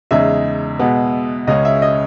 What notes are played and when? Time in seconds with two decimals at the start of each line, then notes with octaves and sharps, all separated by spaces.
0.11 E2 C#3 G#3 D#4 E5
0.79 B2 G#3 B3
1.47 C#2 C#3 G#3 C#4 D#5
1.65 E5
1.82 D#5